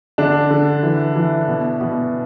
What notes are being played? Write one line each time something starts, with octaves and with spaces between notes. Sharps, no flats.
D3 D4
D3
E3
E3
B2
B2